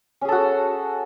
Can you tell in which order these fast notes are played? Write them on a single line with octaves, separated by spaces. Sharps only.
C#4 G#4 A4 F#4